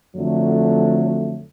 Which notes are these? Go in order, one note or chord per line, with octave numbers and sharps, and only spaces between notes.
F2 D3 F#3 A3